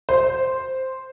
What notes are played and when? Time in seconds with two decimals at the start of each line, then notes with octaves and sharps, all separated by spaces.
0.09 C5